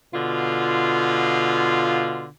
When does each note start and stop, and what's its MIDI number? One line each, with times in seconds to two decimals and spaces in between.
0.14 2.28 47
0.14 2.28 50
0.14 2.28 65